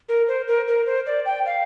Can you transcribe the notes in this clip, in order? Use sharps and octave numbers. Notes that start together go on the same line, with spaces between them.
A#4
C5
A#4
A#4
C5
D5
G5
F5